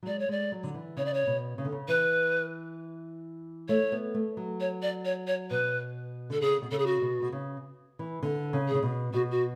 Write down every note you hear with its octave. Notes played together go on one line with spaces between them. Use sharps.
F#3
G#3 D5
C#5
G#3 D5
F#3
D3
E3
C#3 C#5
D5
C#5
B2
C#3
D3
C#3
E3 B4
A3 C#5
B3
A3
F#3
C#5
D5
C#5
C#5
B2 B4
D3 A4
C#3 G#4
B2
C#3 A4
G#4
F#4
B2
B2
C#3
E3
D3
C#3
G#4
C#3
B2
B2 F#4
F#4